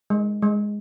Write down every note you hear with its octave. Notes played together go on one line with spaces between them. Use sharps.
G#3
G#3